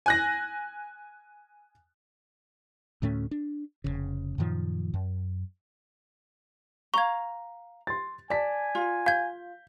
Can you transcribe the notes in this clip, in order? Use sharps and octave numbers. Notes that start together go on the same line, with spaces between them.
G#5 F#6 A#6
D2 A2 A3 C#4
D4
F1 A#1 C#3
F#2 A#2 D#3 F3
F#2
F5 A#5 C#6 G#6
C6 A6
D5 G#5 A5 B6
F4
F5 G6 G#6